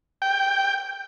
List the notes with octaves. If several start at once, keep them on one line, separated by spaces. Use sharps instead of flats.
G5